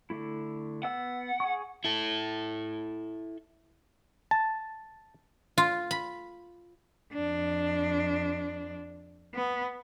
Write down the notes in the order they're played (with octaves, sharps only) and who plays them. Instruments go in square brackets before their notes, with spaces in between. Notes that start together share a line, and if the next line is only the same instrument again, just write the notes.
[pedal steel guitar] D3 A3 E4
[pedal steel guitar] B3 E6 [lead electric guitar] F#5
[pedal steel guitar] G#4 G#5 C#6
[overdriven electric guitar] E4 A4
[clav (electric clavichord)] A5
[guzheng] F4
B5
[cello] F2 D4
B3